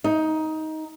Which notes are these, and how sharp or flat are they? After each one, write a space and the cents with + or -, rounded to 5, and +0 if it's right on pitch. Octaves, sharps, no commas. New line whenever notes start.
D#4 +15